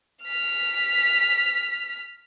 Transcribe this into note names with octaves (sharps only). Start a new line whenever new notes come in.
F6 B6